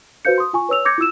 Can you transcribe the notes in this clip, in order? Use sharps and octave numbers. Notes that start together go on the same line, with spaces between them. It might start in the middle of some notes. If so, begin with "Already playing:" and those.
F#4 B4 C5 F5 G6 C#7
C6 D#6
F4 G#5 C#6
B4 C#5 E6 F7
D6 G6 G#6 A#6 C#7
E4 F4 E6 E7